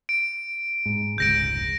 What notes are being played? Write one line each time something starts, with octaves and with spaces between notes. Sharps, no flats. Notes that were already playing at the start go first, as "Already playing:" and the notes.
D7
G#2
F1 C#2 G#2 G6 A#6 D7